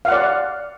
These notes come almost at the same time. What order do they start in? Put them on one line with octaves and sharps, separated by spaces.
F5 F#5 D5